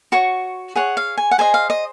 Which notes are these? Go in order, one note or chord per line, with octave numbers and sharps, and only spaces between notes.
F#4 C#5 C#6
G#4 C#5 F#5
F5
G#5
F#5
G#4 C5 D#5 G#5
F5
D#5